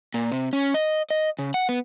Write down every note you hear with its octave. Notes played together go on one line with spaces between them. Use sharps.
A#2
C3
C#4
D#5
D#5
C#3
F#5
B3